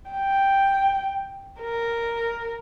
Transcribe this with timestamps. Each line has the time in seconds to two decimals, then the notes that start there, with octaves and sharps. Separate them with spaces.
0.11 G5
1.61 A#4